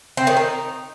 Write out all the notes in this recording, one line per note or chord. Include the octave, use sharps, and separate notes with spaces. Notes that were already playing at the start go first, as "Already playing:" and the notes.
C4
D#3
D#4